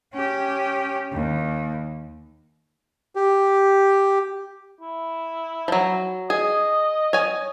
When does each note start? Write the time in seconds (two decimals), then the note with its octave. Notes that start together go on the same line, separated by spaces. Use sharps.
0.14 C#4 G4
1.12 D#2
3.15 G4
4.81 E4
5.68 F3 F#3
6.30 G#4 D#5
7.13 C#5 G#5